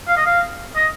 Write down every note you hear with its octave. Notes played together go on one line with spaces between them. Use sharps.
F5
D#5
F5
D#5